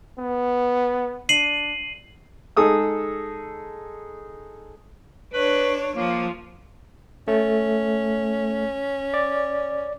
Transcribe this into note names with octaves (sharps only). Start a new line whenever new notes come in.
B3
D4 C7 D#7 F#7
G#3 D#4 G#4 A4 D#6 E6
D4 B4 C#5
F3 A#3
A3 C#4
D5